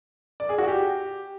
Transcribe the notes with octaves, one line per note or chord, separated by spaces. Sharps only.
D5
G#4
F#4
G4